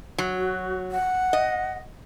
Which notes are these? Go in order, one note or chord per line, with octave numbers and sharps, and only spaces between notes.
F#3
F#4
F#5
D#5